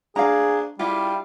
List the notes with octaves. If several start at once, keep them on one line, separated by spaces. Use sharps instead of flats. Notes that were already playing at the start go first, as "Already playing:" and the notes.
D4 G#4 F5 A#5
G3 E4 F4 G4